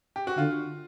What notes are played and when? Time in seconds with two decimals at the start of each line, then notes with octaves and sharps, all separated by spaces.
0.16 G4
0.27 F#4
0.37 D3 F4